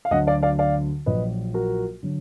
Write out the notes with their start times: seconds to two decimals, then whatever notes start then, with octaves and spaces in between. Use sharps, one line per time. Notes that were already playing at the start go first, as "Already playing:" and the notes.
0.05 F5
0.11 D2 D3 F#3 D#5 F#5
0.27 D5 F5
0.43 D5 F5
0.59 D5 F5
1.06 A#1 A#2 F#3 B4 D#5
1.54 F#4 A#4
2.03 D3 F#3